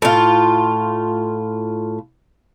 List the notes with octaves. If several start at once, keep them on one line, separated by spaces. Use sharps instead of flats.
A2 F4